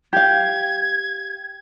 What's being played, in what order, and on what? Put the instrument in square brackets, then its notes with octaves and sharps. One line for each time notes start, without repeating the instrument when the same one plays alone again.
[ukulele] G4 F5 [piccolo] G#6